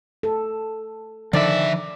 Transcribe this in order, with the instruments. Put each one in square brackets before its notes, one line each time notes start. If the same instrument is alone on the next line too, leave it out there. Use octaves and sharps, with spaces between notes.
[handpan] A4
[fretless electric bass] D3 D#3 [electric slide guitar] F3 E5 [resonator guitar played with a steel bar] D5